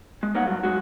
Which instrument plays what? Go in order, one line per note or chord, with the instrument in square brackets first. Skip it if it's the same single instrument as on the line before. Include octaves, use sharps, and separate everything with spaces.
[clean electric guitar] G#3
A#3 B3 D#4 C#5 F#5
G2 F#3
G#3 F#4